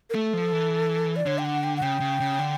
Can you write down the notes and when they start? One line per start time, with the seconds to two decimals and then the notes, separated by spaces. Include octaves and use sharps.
0.10 A#4
0.14 A3 A4
0.33 F3
0.52 E3
1.16 D5
1.26 D3 C#5
1.38 G5
1.45 F#5
1.64 G5
1.76 F#5
1.82 C#3 G5
2.00 C#3
2.20 C#3
2.39 D3